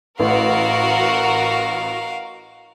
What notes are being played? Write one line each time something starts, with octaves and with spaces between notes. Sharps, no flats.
A1 F#4 A#4 F5